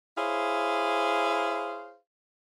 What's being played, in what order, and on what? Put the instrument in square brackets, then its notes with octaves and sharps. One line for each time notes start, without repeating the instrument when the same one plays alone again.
[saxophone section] E4 G#4 C5 C#5 F5